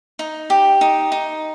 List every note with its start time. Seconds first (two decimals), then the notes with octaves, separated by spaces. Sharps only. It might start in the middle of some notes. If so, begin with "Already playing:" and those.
0.19 D#4
0.50 G4
0.81 D#4
1.12 D#4